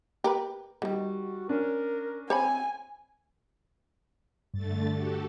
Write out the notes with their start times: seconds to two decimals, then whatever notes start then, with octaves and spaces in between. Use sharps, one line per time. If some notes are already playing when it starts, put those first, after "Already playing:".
0.24 G4 A#4 B4
0.82 D3 D#3 G3 F#4
1.49 C#4 D4 A#4
2.30 C4 C5 C#5 G#5 B5
4.54 G2 D3 A3 A6
4.92 F#4 G4 A4